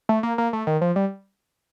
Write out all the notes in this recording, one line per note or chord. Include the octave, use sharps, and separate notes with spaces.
A3
A#3
A#3
A3
D#3
F3
G3